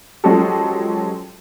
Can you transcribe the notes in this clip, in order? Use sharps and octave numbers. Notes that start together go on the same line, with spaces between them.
F3 F#3 G#3 C#4 G4 A4